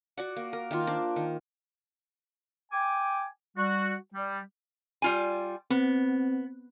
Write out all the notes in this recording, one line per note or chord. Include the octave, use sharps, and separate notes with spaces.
F#4 D5 F#5
A#3
A#4
D#3 A#3 F4
D4 C5 D5
D#3
G5 G#5 D6
G3 F#4
G3
G3 F4 G#5
B3 C4